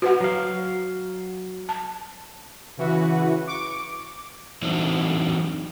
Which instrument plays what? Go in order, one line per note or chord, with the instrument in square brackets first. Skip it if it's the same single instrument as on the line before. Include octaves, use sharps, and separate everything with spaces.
[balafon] F#4 B4 F#5
[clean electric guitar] F#3 F5
[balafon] A5
[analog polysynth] C#3 E3 E4 F#4 B4
C#6 D6
[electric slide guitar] E3 F#3 C4 D4 D#4